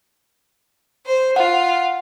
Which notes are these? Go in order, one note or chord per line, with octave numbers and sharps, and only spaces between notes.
C5
F4 F#5